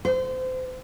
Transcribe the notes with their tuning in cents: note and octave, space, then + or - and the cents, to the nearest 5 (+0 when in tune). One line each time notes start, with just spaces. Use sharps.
C5 -30